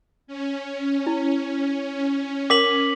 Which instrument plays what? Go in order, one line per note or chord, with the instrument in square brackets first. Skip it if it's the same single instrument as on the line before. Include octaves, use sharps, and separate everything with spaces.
[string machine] C#4
[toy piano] E4
[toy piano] A#4 F#5 [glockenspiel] D6 B6 F#7